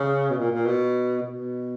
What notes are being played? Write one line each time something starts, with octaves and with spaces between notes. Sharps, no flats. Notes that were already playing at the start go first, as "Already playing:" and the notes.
Already playing: C#3
B2
A#2
A#2
B2
B2